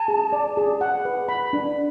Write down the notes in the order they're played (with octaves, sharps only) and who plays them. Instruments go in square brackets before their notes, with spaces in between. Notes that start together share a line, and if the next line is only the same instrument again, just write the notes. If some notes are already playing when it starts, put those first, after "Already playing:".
Already playing: [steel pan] G#5 [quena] A5
[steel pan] G#4
D5
G#4
F#5
B4
B5
D4